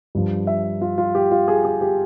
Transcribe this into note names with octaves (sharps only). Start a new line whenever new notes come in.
G2 F3
E5
F4
F4
G4
F4
G#4
G#4
G4